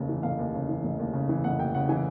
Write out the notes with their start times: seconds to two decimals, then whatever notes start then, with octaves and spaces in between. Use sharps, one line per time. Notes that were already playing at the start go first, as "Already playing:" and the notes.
Already playing: F1 D#2 C#3
0.09 E3
0.23 F1 F5
0.39 D#2
0.54 C#3
0.69 E3
0.83 F1
0.99 D#2
1.14 C#3
1.29 E3
1.44 F1 F#5
1.59 D#2 G5
1.75 C#3 F#5
1.89 E3 G#5